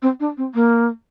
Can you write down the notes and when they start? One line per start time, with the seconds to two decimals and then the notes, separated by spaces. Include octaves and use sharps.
0.02 C4
0.20 D4
0.37 C4
0.54 A#3